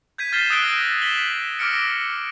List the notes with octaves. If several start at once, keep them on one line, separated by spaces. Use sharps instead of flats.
G6 G#6 B6 D#7
F6 A6 B6 C7 E7 G7
D#6 E6 F#6 D7 G7
A#6
B6 E7 F#7 G7
D6 E6 F6 A#6 C#7 D7